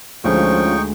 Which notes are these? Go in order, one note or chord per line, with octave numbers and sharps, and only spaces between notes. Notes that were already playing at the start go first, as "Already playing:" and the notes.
D2 F3 G#3 C#4 D#4 F4 G5 C#6